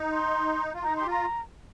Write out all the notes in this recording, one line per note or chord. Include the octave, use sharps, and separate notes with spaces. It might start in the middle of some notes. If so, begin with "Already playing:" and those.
Already playing: D#4
C6
F4
D#4 A#5
G4 C6
F4 A#5